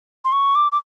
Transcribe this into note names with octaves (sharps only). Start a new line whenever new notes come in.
C6
C#6
D6
D6